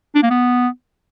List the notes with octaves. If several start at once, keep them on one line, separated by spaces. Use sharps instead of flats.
D4
A#3
B3